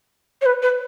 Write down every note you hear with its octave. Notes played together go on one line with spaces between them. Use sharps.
C#5
B4
B4